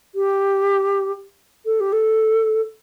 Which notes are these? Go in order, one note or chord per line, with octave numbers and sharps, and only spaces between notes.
G4
A4
G4
A4